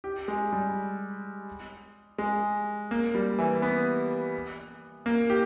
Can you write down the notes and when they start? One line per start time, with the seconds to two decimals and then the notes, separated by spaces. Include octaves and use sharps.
0.04 G4
0.28 G#3
0.53 G3
2.18 G#3
2.91 A#3
3.15 G3
3.39 E3
3.62 B3
5.06 A#3
5.30 G4